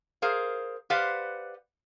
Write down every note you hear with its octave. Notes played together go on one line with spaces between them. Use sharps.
G#4 A#4 C5 F5
G4 B4 C5 D5 F5 F#5